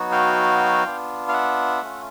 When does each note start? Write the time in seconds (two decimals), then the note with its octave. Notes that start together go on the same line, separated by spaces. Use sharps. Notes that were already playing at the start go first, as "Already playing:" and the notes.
Already playing: F#3 B3 D#4 F#4
0.12 F5 G5
0.85 B3 D4 F4
1.29 F5
1.33 E5 F#5
1.82 A3 C#4 F4